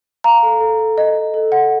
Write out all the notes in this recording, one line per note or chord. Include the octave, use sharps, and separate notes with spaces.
F5 A#5
A4
A4
A4
D#5
D#5
A4
F#5